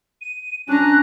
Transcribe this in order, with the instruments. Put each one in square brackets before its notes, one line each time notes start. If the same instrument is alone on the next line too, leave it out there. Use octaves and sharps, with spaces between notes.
[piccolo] D#7
[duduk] C#4 [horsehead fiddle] D4 A#5 [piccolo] F#6